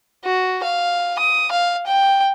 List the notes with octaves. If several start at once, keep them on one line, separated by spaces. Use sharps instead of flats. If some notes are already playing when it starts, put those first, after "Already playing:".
F#4
F5
D#6
F5
G5